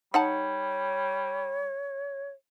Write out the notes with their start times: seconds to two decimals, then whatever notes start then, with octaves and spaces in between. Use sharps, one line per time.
0.14 G3 D#4 C#5 F#5 A5